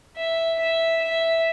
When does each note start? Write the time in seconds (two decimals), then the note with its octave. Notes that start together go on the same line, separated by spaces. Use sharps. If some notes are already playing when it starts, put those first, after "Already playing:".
0.17 E5
0.60 E5
1.02 E5